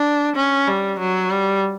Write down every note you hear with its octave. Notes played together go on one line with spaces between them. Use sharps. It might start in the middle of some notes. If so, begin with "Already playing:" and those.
Already playing: D4
C#4
G3
F#3
G3